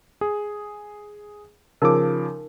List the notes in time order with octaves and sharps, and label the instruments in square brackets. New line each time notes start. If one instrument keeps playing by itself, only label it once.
[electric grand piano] G#4
[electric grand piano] C#3 F3 D6 [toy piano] D#4 A#4